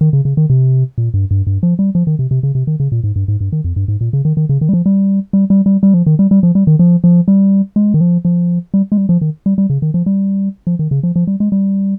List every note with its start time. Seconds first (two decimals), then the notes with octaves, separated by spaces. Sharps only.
0.01 D#3
0.13 C#3
0.25 C#3
0.37 D#3
0.50 C3
0.98 A#2
1.14 G2
1.31 G2
1.47 G2
1.63 F3
1.79 G3
1.95 F3
2.07 D#3
2.19 C3
2.31 C3
2.43 C#3
2.55 C3
2.67 D#3
2.80 C#3
2.92 A#2
3.04 G#2
3.16 G2
3.28 G#2
3.41 G2
3.52 D#3
3.64 F2
3.76 G2
3.88 G#2
4.01 A#2
4.13 C#3
4.25 D#3
4.37 D#3
4.49 C#3
4.61 D#3
4.69 G3
4.73 F3
4.86 G3
5.33 G3
5.50 G3
5.66 G3
5.83 G3
5.94 F3
6.06 D#3
6.19 G3
6.31 G3
6.43 F3
6.55 G3
6.67 D#3
6.79 F3
7.04 F3
7.28 G3
7.76 G#3
7.94 D#3
8.01 F3
8.25 F3
8.74 G3
8.92 G#3
8.97 G3
9.09 F3
9.21 D#3
9.46 G3
9.58 G3
9.70 C#3
9.82 D#3
9.94 F3
10.06 G3
10.67 F3
10.79 D#3
10.91 C#3
11.03 F3
11.16 F3
11.27 G3
11.40 G#3
11.52 G3